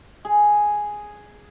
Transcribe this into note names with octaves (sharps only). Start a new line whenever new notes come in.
G#4